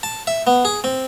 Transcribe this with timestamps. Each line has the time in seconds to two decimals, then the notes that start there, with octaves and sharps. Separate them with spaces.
0.03 A5
0.27 E5
0.47 B3
0.65 G#4
0.84 C4